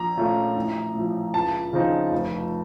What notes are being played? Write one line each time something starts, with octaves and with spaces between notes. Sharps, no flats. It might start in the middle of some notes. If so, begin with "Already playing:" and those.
Already playing: A#1 A#5
A#2 A3 C#4 F4
A1
A2 F3
C#2 A5
C#3 F3 C4 D#4
F1